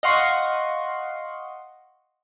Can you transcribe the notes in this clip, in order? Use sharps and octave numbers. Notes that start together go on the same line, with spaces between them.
D#5 F5 F#5 C6 C#6